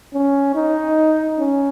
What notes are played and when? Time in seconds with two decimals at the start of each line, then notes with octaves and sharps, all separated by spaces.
0.14 C#4
0.55 D#4
1.39 C#4